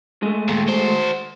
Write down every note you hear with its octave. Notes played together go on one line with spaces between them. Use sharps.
G#3 A3
D#2 A#2
F#4 C5